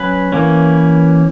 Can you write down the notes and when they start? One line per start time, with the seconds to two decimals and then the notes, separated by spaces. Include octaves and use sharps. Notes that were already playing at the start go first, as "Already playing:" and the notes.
Already playing: F#3 C#4 B4
0.32 E3 A#3 C#4